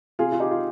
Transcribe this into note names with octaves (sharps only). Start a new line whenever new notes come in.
C3 F4 G#4
F4
D#4 G4
F4